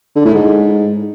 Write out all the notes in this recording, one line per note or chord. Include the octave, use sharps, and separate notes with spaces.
D3
A2
G#2